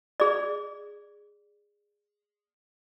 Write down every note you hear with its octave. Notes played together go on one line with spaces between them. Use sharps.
G#4 D5